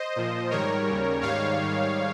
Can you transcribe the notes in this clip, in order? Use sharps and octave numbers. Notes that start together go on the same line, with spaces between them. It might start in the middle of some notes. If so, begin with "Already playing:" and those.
Already playing: C5 D#5
A#2 F3
G#2 D#3 G3 A#4 C#5
D#2 C#3 G3
G#2 D#3 G3 C#5 F5
G#2 D#3 G3